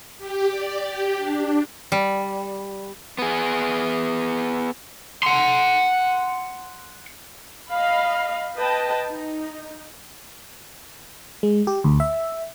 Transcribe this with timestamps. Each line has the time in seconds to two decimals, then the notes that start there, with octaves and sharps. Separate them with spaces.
0.18 G4
0.51 D5
0.82 G4
1.17 D4
1.92 G3
3.18 B3 G#4
5.23 F#5 C6
7.71 D#5 F5 B5
8.57 B4 D#5 G5 A5
9.09 D#4
11.43 G#3
11.67 G4
11.84 D2
12.00 E5